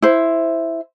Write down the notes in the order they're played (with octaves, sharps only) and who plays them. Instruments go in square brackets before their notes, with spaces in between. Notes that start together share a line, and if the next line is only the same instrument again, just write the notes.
[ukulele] E4 C5